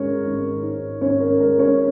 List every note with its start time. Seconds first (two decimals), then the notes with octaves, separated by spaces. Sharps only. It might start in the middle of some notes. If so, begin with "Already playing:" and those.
Already playing: G#1 G#3 C#4 A#4 C#5
0.25 G#1
0.63 G#2
1.01 G#1 C#4 C#5
1.20 A#4
1.40 G#3 A#4
1.59 C#4 C#5